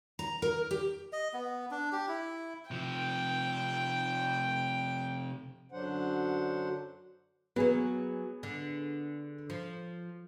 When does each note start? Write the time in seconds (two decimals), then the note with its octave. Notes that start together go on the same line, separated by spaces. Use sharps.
0.19 A#5
0.42 A#4
0.71 G4
1.13 D#5
1.34 B3
1.71 D4
1.92 G4
2.08 E4
2.71 C3 F3 G5
5.72 F#2 D3 F#3 D4 C5 F#5
7.56 F#3 A#3 B3 G#4
8.43 D3
9.50 F3